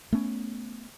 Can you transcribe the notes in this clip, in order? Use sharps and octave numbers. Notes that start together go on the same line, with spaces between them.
A3 B3 C#4